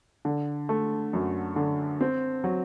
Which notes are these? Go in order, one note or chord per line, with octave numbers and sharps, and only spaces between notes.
D3
A3
F#2
D3
C4
F#3